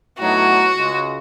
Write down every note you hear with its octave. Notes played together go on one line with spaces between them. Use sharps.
A2 F#3 B3 D#4 F#4
C#2 C#3 G#3